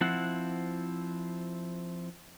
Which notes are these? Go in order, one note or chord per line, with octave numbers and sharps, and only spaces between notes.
F3 C4 E4 F#5